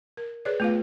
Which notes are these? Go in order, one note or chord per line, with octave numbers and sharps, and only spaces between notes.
A#4
G#4 B4 C#5 D5
A3 B3 F4 B4 F5